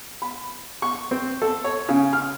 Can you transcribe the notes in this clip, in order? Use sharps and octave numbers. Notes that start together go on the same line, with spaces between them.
B5
C#6
C4
A4
C#5
C#3
F6